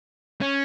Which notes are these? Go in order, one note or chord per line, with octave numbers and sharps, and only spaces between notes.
C#4